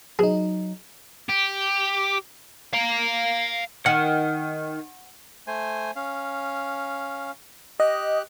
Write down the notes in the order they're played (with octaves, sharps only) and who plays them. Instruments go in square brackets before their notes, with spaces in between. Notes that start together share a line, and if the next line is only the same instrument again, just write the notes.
[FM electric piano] F#3 D#4 [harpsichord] G#4
[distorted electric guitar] G4
F5 A#5
[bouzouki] D#3 [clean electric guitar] F#5
[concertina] A3 C5 G#5
C#4 F5
[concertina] G4 F#6 [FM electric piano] D#5